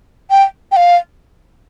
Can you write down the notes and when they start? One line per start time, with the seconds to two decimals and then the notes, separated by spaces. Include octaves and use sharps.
0.30 G5
0.72 G5
0.76 F5